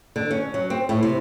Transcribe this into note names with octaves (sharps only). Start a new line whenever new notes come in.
D3
C#4
F#3
C4
A2
C3